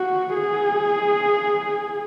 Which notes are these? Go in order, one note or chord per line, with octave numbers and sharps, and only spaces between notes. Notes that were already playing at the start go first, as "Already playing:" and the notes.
Already playing: F#4
G#4